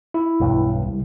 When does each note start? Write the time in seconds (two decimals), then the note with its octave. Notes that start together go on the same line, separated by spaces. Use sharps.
0.14 E4
0.40 B1 E2 G2
0.83 C2